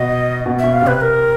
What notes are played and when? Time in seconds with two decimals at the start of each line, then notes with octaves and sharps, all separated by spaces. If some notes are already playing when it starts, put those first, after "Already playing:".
Already playing: B2 D#5
0.46 B2
0.59 B2 E5
0.73 F5
0.82 C3 B4
1.01 A#4